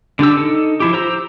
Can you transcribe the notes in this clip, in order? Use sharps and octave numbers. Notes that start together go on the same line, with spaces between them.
D3 D4 G4 E6
D#4 A4
F3 E4 G4
G4 C5 A#5 E6